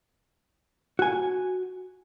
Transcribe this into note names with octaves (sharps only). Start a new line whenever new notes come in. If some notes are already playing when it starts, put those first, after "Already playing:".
F#4 G#5